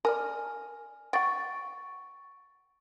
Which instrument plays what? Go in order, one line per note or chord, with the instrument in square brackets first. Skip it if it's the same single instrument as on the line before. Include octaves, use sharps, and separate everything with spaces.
[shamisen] A#4 D5 [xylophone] G#5 F6
[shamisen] F#5 G5 [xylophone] C#6 A6 D7